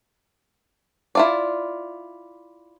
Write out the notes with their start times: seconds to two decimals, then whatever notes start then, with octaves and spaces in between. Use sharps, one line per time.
1.15 E4 F4 D5